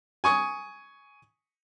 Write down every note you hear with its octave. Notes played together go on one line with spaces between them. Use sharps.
G#5 C#6 D#6